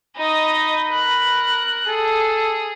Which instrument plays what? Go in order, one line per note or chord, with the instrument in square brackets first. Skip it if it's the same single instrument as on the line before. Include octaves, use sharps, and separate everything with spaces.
[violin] D#4 D#5 [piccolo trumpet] B5
[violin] A#4 F#6
[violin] G#4 [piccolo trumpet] A4